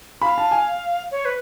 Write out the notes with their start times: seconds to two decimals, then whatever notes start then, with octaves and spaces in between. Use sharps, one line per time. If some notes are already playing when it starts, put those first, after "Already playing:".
0.21 F5 B5
0.38 A5
0.51 G#5
1.11 C#5
1.25 B4